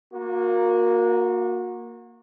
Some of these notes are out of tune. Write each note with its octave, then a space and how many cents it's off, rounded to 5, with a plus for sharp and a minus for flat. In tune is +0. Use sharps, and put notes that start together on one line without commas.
A#3 +0 F#4 -35